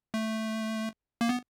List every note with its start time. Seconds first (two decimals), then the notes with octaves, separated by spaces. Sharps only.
0.14 A3
1.21 A#3
1.29 B3